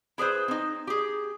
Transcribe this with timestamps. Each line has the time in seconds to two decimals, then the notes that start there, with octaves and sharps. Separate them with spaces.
0.18 E4 G#4 B4 C5
0.48 C4 D#4
0.87 G4 G#4